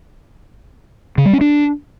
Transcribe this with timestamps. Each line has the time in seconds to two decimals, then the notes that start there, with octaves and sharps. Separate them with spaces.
1.18 C#3
1.26 G3
1.33 C#4
1.41 D4